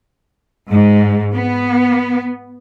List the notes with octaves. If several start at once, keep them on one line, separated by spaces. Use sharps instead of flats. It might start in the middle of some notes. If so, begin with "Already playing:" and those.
G#2
B3